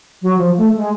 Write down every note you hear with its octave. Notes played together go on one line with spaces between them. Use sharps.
F#3
F3
A3
G#3